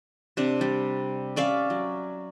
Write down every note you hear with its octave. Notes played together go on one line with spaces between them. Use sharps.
C3 D4
G3
C#4 D5 E5 F5
F#3